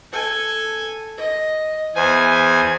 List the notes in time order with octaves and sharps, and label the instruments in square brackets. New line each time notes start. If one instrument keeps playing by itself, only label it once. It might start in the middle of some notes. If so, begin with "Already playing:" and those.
[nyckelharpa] A4 G#5
D#5
[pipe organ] E2 G#5 [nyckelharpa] C5